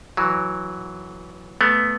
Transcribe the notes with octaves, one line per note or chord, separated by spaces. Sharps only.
E3 F#3
A3 B3